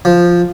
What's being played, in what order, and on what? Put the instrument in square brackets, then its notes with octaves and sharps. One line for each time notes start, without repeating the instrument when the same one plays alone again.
[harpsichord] F3